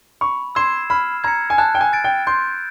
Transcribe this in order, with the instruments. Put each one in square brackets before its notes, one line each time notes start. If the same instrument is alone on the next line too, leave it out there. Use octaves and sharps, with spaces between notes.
[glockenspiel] B5 [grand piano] C#6
[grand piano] C6 [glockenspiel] E6 G#6 C7 E7
[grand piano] B5 [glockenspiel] F6
[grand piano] A#5 [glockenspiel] G#6 C#7
[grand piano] G#5
[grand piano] A5 [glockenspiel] F#6
[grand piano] G5
G#5
[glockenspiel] A6 D7
[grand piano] G5
[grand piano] C6 [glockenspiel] G6